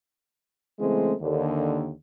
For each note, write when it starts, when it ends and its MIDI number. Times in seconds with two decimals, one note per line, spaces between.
0.80 1.13 49
0.80 1.13 52
0.80 1.13 56
0.80 1.13 57
0.80 1.13 60
0.80 1.13 61
1.21 1.92 39
1.21 1.92 50